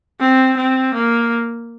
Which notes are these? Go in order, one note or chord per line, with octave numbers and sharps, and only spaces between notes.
C4
C4
A#3